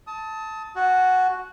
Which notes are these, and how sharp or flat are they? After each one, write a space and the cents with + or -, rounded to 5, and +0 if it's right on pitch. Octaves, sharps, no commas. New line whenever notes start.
A5 +0 D#6 +35
F#4 +0 F#5 +0 A5 -45